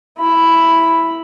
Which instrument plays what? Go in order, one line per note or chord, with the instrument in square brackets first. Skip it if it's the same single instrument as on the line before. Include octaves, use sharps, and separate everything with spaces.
[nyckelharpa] E4 B5